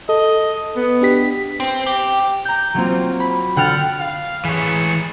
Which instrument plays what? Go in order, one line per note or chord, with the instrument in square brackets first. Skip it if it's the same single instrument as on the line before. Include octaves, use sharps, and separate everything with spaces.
[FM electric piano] A4 [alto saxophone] D#5
[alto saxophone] B3
[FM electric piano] D4 G4 B6
[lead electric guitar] C4
G4
[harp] A#5 G6
F#3 A#3 C4 F4
B5
D3 F#5 G5 F6 A6
[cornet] F5
[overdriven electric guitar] E3 C#5 [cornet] G#4